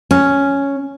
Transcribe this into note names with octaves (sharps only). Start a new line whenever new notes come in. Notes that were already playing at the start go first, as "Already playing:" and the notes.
C#4